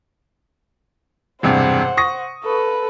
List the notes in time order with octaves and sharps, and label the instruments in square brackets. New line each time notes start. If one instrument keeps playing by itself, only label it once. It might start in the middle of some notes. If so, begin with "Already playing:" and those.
[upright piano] E1 G2 C3 [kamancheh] C5 F#5
[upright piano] C#6 D#6 A#6
[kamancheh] A4 B4